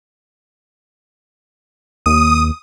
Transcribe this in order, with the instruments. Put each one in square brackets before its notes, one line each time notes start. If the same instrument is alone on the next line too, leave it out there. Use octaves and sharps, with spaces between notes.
[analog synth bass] D#2 [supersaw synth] D#6